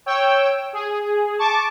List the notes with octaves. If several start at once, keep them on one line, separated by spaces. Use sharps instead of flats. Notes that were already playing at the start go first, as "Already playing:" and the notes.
C#5 G5 E6
G#4
A5 C#6 D6